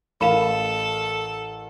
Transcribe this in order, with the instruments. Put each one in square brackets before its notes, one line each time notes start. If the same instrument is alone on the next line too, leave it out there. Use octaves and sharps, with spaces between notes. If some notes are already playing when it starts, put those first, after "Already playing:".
[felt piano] A1 A#4 E7 [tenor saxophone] A4 [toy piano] F5 B5 [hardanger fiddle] A5